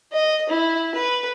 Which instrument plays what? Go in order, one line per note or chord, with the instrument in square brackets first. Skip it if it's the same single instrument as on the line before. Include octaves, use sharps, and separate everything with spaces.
[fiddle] D#5
E4
B4